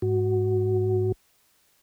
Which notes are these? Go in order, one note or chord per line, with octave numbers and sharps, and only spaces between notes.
G#2 F#4